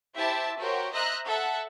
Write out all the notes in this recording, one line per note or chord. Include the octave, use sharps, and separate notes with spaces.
E4 G4 C5 E5 A5
F#4 G4 A#4 C5 C#5
C5 D#5 E5 A#5 F#6 A#6
A4 E5 F#5